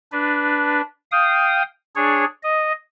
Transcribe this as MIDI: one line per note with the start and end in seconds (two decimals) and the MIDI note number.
0.12 0.81 62
0.12 0.81 71
1.12 1.62 77
1.12 1.62 79
1.12 1.62 87
1.96 2.25 62
1.96 2.25 68
1.96 2.25 73
2.43 2.72 75